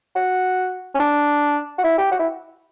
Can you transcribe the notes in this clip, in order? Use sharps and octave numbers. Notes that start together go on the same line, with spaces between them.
F#4
C#4
D4
F#4
E4
G4
F#4
E4